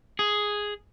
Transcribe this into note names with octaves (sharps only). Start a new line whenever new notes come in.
G#4